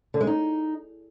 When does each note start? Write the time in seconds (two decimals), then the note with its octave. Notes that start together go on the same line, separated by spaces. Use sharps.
0.14 D3
0.21 G#3
0.27 D#4